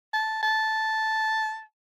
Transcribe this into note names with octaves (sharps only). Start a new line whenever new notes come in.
A5
A5